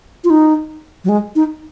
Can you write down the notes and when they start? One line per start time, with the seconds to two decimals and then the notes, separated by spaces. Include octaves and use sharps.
0.24 F4
0.30 D#4
1.04 F#3
1.09 G#3
1.35 D#4